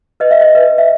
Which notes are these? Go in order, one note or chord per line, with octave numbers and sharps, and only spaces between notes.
B4 D#5
E5
D#5
B4
E5